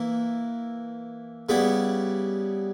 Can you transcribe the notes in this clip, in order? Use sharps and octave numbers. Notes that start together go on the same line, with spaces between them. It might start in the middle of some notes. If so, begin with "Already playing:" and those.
Already playing: E3 A#3 E4
C#3 G3 B3 E4